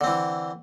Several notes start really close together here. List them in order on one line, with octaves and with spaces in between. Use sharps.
D3 C4 E3